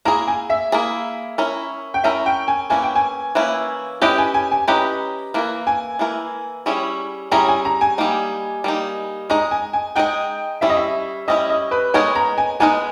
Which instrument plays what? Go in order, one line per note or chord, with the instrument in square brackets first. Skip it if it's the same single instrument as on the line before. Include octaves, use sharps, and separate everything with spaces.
[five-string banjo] A#3 E4 G#4 [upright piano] A#5
[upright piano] G#5
E5
[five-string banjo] A#3 E4 G#4
C#4 E4 A#4
[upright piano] G5
[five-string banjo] C#4 E4 A#4 [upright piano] E5
[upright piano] G5
G#5
[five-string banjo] E3 A#3 C#4 E4 [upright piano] G#5
[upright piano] G5
G#5
[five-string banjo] E3 A#3 C#4 E4
[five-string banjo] C#4 E4 G4 B4 D#5 [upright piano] G5
[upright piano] G#5
G#5
G#5
[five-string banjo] C#4 E4 G4 B4 D#5 [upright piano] A#5
[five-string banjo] E3 A#3 E4 A#4
[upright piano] G#5
[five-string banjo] E3 A#3 E4 A#4
G3 C#4 E4 G#4 C#5
[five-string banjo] G3 C#4 E4 G#4 C#5 [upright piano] A#5
[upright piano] G#5
A#5
G#5
[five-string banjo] G3 A#3 D#4
G3 A#3 D#4
[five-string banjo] G#3 D#4 G#4 D#5 [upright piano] A#5
[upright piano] G#5
G#5
[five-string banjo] G#3 D#4 G#4 D#5 [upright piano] G5
[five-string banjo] G3 C#4 E4 [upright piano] E5
[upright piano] D#5
E5
[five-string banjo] G3 C#4 E4 [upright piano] D#5
[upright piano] D#5
B4
[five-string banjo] G#3 B3 D#4 A#4 D#5 [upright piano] C#5
[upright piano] A#5
G#5
[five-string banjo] G#3 B3 D#4 A#4 D#5 [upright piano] G#5